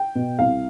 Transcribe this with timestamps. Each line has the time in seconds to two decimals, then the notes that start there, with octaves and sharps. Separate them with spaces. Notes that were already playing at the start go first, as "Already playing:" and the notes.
Already playing: G5
0.15 B2
0.39 C2 F5